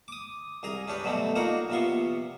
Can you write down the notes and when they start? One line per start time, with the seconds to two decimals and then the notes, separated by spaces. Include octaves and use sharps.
0.08 D6 D#6
0.63 C2 G#4 A#5 D#6
0.88 C#4 D4 G4 B4
1.04 B2 F#3 G3 A3 C4
1.35 A#3 D#4 F4 F#4 A#4 F#5
1.70 A#1 C3 B3 F4 C6 C#6